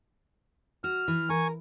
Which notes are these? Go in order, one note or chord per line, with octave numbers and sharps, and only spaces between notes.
F#4 F6
E3
A#4 G#5 C#6